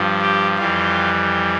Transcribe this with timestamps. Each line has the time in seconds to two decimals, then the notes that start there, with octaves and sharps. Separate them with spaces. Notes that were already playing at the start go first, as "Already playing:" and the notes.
Already playing: G2 F3
0.21 G4
0.58 F2 E3 G3 F4